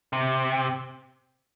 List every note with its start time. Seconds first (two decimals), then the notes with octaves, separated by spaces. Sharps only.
0.13 C3